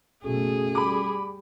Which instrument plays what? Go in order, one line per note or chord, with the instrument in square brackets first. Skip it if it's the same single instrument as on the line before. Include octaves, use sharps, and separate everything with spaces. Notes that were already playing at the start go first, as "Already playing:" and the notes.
[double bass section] F#1 B2 A3 [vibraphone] C#4 F#4 A4 [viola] G#4
[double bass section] G3 [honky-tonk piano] B5 D6